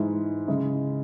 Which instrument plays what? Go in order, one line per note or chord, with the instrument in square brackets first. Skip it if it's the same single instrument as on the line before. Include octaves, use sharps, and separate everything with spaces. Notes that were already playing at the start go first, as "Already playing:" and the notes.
Already playing: [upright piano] G#2 E3 G#3 E4
C#3 G#3 E4